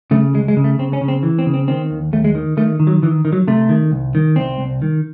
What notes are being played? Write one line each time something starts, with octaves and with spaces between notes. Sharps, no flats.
C#3 A3
C#2 G#3
G#3
C#3
A3
C#3 C4
C#4
C#3
C4
E3
C4
C#3
C4
D#3 C4
D#2
D#2 A3
G#3
D#3
D#3 A3
D#3
F#3
D#3 E3
D#3
F#3
C3 A3
D#3
C2
D#3
C2 C4
C2
D#3